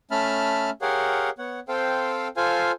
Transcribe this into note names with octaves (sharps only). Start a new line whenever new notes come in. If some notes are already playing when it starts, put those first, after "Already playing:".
A3 C#4 E5 A5 B5 F6
G4 G#4 A#4 C#5 F5 F#5
B3 C#5 F#5
C4 A4 C5 F5 G5
F4 A4 C5 F5 G#5